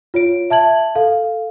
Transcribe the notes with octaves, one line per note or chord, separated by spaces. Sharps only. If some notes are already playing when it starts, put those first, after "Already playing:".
F4 C#5 D7
E5 A5 G#6 F#7
A4 F5